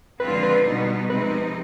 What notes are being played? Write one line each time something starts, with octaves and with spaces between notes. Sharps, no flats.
D3 F3 G#3 C4 F4 B4
B4
B2 G3 B3 D#4
C3 F3 G#3 C4 D#4 B4